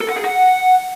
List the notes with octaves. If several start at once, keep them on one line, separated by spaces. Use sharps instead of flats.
A4
F#5
G#4
F#5